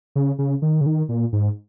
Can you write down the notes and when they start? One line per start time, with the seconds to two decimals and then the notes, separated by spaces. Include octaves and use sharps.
0.16 C#3
0.39 C#3
0.62 D#3
0.81 C#3
0.86 D#3
1.09 A#2
1.33 G#2